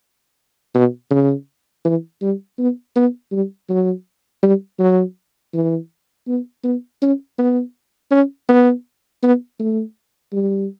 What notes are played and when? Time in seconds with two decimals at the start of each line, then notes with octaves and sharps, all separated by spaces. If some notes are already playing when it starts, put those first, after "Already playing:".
0.75 B2
1.11 C#3
1.85 E3
2.22 G3
2.59 B3
2.96 B3
3.32 G3
3.69 F#3
4.43 G3
4.79 F#3
5.54 E3
6.27 B3
6.64 B3
7.02 C#4
7.39 B3
8.11 C#4
8.49 B3
9.23 B3
9.60 A3
10.33 G3